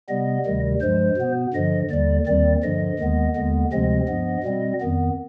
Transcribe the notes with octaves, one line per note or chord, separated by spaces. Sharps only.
C3 G3 B3 D#5
D2 C3 D#3 G3
G2 F3 G#3 C5
B2 B3
G2 D3 F3 D#5
D#2 D3 G3 D5
D#2 D#3 G3 C4 D5
G2 D3 F3 D#5
D#2 D#3 G#3 B3
D#2 D3 G#3 B3
D2 C3 F3 G#3 C4 D#5
G2 F3 B3
B2 G3 C4
F2 D#3 B3